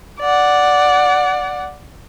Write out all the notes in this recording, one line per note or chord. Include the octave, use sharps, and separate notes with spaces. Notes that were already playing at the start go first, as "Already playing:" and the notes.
D5 F#5